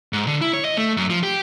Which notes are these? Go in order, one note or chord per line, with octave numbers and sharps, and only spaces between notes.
G#2
D3
E4
C#5
D#5
A3
F#2
F3
G4